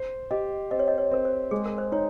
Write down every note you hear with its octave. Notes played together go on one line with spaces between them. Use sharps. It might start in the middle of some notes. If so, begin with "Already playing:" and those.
Already playing: C5
G4 D#5
C4 D#5
C#5
D#5
C#5
C4 A#4
C5
G#3 G#4
A#4
C5
D#4 C#5